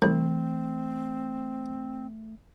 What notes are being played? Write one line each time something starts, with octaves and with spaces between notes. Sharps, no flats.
C2 E3 A3 C4